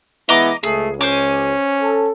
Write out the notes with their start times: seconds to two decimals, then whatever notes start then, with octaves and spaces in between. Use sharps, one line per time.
0.29 E3 G#3 B3 E4 D#5 A#5 D6
0.63 C#2 A3 G#4
1.01 C#4 C5 G#5 D6
1.80 A4